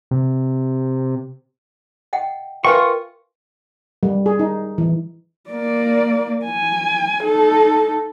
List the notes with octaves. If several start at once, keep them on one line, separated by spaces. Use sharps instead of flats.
C3
D#5 F#5 G5
F4 A#4 B4 E5 G5 G#5 C#6
G3
G#4
D#4
E3
A#3 D5
G#5
D#4 A4